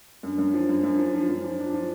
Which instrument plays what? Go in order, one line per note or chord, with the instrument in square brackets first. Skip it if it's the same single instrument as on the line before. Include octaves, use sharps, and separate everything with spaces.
[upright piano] F#2 [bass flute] D4
[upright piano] F#2
F3
F#2
F#2
F3
F3
F#2
[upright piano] F3 [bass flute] F4
[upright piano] D4
F3